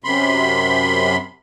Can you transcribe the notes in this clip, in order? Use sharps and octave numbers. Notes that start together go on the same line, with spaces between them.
F#2 C3 B5 C6